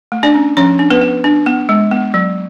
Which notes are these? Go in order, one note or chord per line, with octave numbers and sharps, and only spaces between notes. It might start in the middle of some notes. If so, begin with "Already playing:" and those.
A3
D4 D5
C#4
F3 C#4 C#5
D4
B3 B4
B3
D4
B3
G#3
B3
F#3